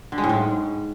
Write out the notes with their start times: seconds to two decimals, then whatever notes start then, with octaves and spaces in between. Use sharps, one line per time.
0.12 D3
0.18 G#3
0.24 A2
0.29 G#2